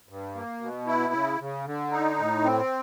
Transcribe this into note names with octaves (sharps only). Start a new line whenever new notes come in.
G2
A#3
B2
E4
C#3
C#3
D3
D#4
A2
C4